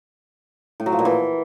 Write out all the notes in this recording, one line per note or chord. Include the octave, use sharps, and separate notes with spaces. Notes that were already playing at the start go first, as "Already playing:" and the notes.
A2
F#3
F3
A#2
E3